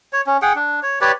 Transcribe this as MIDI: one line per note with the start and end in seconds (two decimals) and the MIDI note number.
0.13 0.21 73
0.27 0.38 61
0.42 0.53 68
0.42 0.53 78
0.42 0.53 79
0.56 0.80 62
0.83 0.99 73
1.01 1.12 67
1.01 1.12 71
1.01 1.12 73
1.01 1.12 74